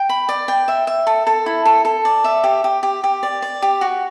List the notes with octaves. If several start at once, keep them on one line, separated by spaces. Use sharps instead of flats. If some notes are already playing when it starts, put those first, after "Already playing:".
Already playing: G5
B5
D5
G5
E5
E5
A4
A4
E4
A4
A4
D5
E5
G4
G4
G4
G4
D5
D5
G4
F#4